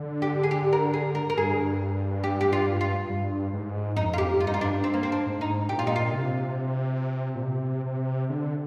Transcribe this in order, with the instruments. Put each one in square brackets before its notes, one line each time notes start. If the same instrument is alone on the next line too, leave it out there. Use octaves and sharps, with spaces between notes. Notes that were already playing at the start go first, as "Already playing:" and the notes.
Already playing: [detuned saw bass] D3
[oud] G4
G#4
G4
A#4
G#4
A#4
A#4
[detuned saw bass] G2 [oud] G#4
[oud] G4
G4
F4
F4
[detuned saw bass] G2
G#2
[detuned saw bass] F2 [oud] D#4
[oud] F4
G4
[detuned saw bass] G2 [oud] F4
[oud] D#4
F4
D4
C4
A#3
C4
D4
[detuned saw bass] G#2
[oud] D#4
[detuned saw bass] A#2 [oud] G4
[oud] F4
D#4
F4
[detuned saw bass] C3
A#2
C3
C3
D3